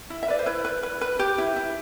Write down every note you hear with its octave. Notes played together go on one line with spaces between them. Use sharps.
E4
E5
B4 D5
C5
E4 B4
B4
B4
B4
G4
E4
E4